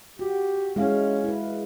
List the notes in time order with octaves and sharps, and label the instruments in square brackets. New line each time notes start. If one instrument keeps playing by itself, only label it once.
[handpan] F#4 [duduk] G4
[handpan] G#3 E4 F5 [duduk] C#4
[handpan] E4 B4